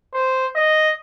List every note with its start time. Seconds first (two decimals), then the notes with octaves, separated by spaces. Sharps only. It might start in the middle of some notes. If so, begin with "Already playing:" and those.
0.14 C5
0.56 D#5